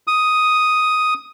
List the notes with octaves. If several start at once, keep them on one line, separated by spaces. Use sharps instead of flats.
D#6